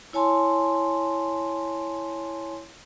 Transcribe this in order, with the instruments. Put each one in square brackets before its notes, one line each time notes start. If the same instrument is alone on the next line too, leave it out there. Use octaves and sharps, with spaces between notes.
[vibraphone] E4 C#5 G#5 A5 C6